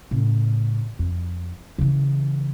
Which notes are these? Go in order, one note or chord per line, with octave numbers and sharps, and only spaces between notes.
A2 C#3
F2
C#3 E3